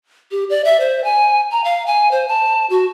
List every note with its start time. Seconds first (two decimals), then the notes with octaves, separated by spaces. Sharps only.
0.31 G4
0.50 D5
0.65 E5
0.80 C5
1.04 G#5
1.52 A#5
1.64 F5
1.87 G#5
2.11 C5
2.28 A5
2.70 F#4